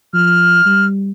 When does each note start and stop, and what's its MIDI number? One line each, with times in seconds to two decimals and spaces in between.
0.13 0.63 53
0.13 0.86 89
0.66 1.11 55